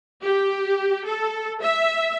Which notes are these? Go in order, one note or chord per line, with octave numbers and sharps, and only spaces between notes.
G4
A4
E5